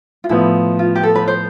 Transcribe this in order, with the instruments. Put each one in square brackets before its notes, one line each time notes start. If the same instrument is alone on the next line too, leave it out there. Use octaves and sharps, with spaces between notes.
[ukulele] F4
[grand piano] A2 F3 B3 [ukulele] E4
[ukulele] F4
G4
A4
B4
C5